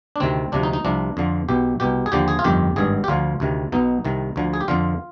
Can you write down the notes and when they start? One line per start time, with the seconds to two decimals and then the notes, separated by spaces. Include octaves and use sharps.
0.16 D4
0.20 D2 C3 D#3 C4
0.52 D2 C3 F3 D4
0.63 D#4
0.73 D#4
0.85 C2 C3 F3 D4
1.17 F2 D3 F3
1.49 B1 B2 G4
1.80 C2 B2 G4
2.06 G#4
2.12 D#2 D3 F3 G4
2.28 G#4
2.39 F4
2.44 G1 F2 D#3 G4
2.76 G#1 G2 D#3 G#4
3.04 G4
3.08 D2 D3 F3 F4
3.40 D2 C3 D#3
3.72 B1 B2 D#4
4.05 C2 C3 D#3
4.36 D2 D3 F3
4.54 G#4
4.61 G4
4.68 F2 D3 F3 F4